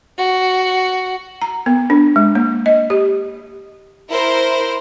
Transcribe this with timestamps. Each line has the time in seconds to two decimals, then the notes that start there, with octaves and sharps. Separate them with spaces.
0.18 F#4
1.42 A#5
1.66 B3
1.90 D4
2.16 G#3
2.35 A#3
2.66 D#5
2.90 G4
4.09 E4 A#4 C5